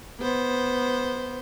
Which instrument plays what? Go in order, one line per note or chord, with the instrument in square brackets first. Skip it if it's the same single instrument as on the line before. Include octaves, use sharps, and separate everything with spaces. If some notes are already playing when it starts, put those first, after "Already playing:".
[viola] B3 C5